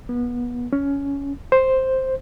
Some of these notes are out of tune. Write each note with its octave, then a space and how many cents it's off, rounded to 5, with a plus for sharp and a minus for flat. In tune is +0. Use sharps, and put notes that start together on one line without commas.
B3 -25
C#4 +15
C5 +5